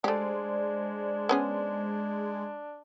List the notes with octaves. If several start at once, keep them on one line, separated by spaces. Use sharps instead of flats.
G#3 A3 D4 G4 C5 D5
B3 C#4 G#4